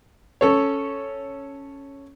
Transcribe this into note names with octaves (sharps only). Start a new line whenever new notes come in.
C#4 A4 C#5